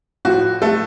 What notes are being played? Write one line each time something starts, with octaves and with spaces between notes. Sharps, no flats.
A2 F3 F#4
A3 A4